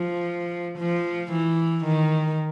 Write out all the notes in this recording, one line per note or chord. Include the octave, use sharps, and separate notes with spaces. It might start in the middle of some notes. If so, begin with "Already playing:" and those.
Already playing: F3
F3
E3
D#3